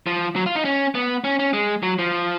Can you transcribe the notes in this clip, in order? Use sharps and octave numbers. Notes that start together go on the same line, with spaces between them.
F3
F#3
F4
D#4
C#4
B3
C#4
C#4
G#3
F#3
F3